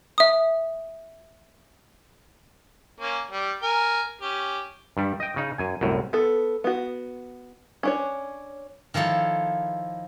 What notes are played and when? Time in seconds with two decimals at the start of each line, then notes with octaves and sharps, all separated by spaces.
0.18 E5 D#6
3.00 A#3 C#4
3.31 G3
3.63 A#4 G#5
4.21 C#4 G4
4.97 G2 G3
5.20 D#5 G5
5.36 C#3 D#4
5.58 F#2 G#5
5.81 C2 F#2 A2
6.13 B3 A4
6.64 B3 F#4
7.83 C#4 D4 C#5
8.94 D#3 F3 E4 A4 C#5